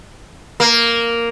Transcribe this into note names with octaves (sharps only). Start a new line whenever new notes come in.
A#3